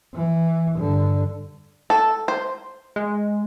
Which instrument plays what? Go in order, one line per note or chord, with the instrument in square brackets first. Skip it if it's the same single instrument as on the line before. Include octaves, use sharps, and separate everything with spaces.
[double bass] E3
G2 D3
[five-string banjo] A4
C5
[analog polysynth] G#3